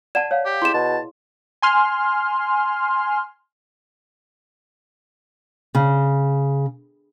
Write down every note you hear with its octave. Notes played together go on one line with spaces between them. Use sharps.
D5 F#5 A5 E7
C#5 F5 F#5
G4
E4 G#4 D#5 C6 E7
B2 A5
G#5 C6 F6
C#3